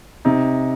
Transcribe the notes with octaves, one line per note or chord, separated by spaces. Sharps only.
C3 D#4